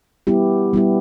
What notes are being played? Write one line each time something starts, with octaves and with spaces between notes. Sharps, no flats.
G3 B3 E4 G4
G3 B3 E4 G4